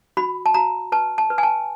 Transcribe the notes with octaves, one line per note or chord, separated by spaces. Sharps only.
F#4 B5
A5
F#4 A#5
B4 A5
A5
B4
G#5
A5